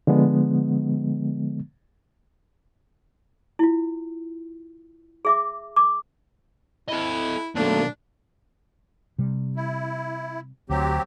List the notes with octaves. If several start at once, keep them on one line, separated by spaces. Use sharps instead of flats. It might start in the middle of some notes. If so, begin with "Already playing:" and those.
D3 F3 G#3 B3
E4 F4
G#4 E5 D6
D6
E4 A4 D#5
B2 D#3 F#3 A3 A#3 D4
C3 G3
E4
D2 F#3 C4 G4